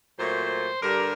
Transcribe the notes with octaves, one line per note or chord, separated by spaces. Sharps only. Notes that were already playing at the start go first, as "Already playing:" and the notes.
A#2 F#3 A3 C5
G2 D3 G3 A#4